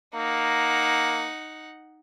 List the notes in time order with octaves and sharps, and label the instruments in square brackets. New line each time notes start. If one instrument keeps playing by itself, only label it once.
[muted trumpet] A#3 [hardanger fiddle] D#4 F#5